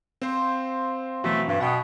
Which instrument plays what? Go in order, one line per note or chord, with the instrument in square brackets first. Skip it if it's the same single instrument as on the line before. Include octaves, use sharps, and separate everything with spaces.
[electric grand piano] C4 C5 [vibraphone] F5 C6
[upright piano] B2 E3 F#3 [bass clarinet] A3
[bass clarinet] G2
[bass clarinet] B2 [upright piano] F#5 G5 D#6